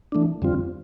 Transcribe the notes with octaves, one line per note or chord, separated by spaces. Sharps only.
E3 A3 D4
F2 D3 G3 C4 F4